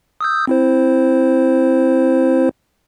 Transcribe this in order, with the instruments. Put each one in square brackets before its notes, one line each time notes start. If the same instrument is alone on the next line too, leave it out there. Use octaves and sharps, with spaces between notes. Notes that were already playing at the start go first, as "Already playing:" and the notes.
[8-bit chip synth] D#6 E6 G6
C4 E4 C5